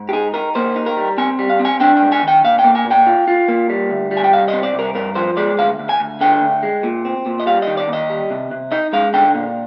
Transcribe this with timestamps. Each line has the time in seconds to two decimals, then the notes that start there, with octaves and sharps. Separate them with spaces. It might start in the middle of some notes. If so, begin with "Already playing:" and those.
Already playing: G#2
0.09 G4
0.13 D#4 G#4
0.34 D#4 A#4
0.55 A#3 C5
0.76 D#4
0.86 A#4
0.96 G3
1.18 C4 G#5
1.39 G3
1.50 F5
1.59 C4
1.65 G#5
1.80 D4 G5
1.97 G#2 G5
2.12 G#5
2.23 D#3 G5
2.44 A#2 F5
2.59 G5
2.64 A#3
2.75 G#5
2.85 A#2
2.91 G5
3.07 F4
3.28 F4
3.48 A#3
3.69 G3
3.90 D2
4.11 G3
4.17 G#5
4.24 G5
4.32 C2 F5
4.48 C4 D#5
4.63 D5
4.73 C2
4.79 A#4
4.95 G2 A#4
5.15 F3 C5
5.37 G#3 D5
5.58 D2 F5
5.79 D2
5.89 G#5
6.00 D2
6.21 D3 G5
6.42 D2
6.63 G#3
6.83 A#2
7.05 C4
7.26 A#2
7.40 D#5
7.46 G3 F5
7.62 D#3 D#5
7.77 D5
7.88 D#2
7.93 D#5
8.10 G3
8.30 C3
8.51 C3
8.72 D#4 D#5
8.93 G#3 F5
9.13 D3 G5
9.35 A#2